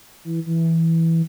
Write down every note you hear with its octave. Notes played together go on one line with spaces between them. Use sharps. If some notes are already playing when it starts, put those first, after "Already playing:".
E3
E3